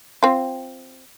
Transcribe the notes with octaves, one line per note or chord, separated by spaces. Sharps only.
C4 F4